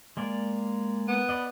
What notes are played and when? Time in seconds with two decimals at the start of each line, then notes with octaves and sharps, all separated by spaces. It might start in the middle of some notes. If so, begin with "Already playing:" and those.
0.17 G#3 A#3 D5
1.08 B3
1.29 B4 D5 D#5